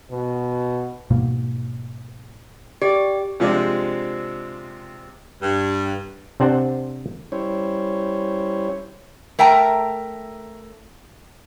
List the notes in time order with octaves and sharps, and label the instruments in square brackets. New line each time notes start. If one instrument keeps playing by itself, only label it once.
[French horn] B2
[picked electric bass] G#2 B2 A#3
[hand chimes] G4 [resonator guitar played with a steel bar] D5
[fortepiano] C3 F3 G#3 C4 D4
[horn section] G2
[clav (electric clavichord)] C3 C4 D4 C5 F#5
[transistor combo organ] G3 C#4 E4 C5 C#5
[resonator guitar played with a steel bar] A3 A#4 E5 G5 A5 A#5